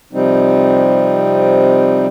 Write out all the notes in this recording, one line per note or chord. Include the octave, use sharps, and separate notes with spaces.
C3 F3 G3 C4 D#4